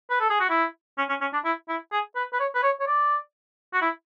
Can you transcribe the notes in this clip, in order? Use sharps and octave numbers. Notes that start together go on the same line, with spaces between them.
B4
A4
G#4
F#4
E4
C#4
C#4
C#4
D4
E4
E4
G#4
B4
B4
C#5
B4
C#5
C#5
D5
F#4
E4